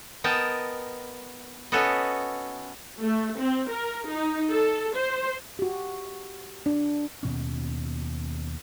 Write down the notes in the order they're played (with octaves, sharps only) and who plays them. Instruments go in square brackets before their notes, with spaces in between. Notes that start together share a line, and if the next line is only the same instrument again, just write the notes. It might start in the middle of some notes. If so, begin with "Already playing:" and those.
[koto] B3 A#4 D#5 G5 A5
B3 C#4 F#4 A4 B4 D#5
[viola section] A3
C4
A#4
D#4
A4
C5
[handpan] F#4 G4
D4
[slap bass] D#2 B2 C#4